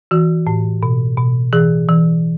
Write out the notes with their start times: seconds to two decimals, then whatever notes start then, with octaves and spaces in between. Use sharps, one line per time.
0.11 E3 F#4
0.47 A2
0.83 B2
1.18 B2
1.53 E3 G#4
1.89 E3